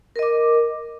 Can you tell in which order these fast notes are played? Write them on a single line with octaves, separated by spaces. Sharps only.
A#4 D#5 D6